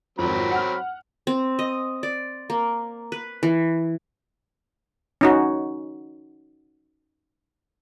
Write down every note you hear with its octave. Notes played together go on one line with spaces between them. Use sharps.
G#1 F2 F#3 C4 B5
F#5 F6
C4
D#5
D5
A#3
B4
E3
C#4 D#4 F#4